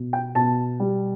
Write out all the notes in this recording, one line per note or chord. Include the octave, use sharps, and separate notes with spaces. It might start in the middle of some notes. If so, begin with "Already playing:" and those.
Already playing: B2
G5
B2 A5
G3